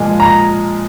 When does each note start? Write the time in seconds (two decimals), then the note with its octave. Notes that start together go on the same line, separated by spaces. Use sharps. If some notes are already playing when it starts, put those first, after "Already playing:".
Already playing: A#2 F3 G#3
0.20 A#5